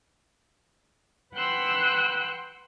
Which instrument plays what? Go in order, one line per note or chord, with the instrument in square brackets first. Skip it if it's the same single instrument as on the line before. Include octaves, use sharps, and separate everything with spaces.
[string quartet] B4 F#5 G5 C6 E6 F#6